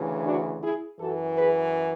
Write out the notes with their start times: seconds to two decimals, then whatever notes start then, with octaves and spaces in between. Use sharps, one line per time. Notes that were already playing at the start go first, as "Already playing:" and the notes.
Already playing: D2 C#3 E3
0.25 D4 F#4
0.62 E4 G#4
1.00 F#2 E3 F#4 A4
1.36 G#4 B4